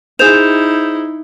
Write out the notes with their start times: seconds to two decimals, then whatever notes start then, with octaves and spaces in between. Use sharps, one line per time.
0.19 D#4 E4 G#4 C5 G6 E7 F7